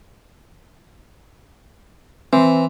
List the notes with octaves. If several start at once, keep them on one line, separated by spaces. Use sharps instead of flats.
E3 C4